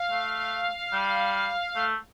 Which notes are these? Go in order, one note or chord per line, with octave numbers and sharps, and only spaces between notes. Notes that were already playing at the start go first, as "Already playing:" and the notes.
Already playing: F5
A3
G3
A3